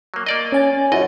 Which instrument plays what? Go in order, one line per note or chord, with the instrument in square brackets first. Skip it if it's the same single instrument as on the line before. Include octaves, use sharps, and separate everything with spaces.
[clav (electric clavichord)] F#3 A#3
A#3 D5 D#5
[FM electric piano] C#4 G#5 A6
[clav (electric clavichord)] A#1 F#2 D#5 [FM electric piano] E4 F#4 C#5